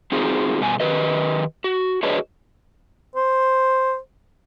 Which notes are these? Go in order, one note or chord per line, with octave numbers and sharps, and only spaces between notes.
C4 D#4 F4 F#4 G#4 C5
G2 B2 B3 G#5
D#3 G4 B4 D#5
F#4
D4 F#4 G#4 B4 C#5 D#5
C5